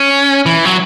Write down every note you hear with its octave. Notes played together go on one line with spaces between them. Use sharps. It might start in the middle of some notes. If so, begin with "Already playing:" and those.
Already playing: C#4
E3
F#3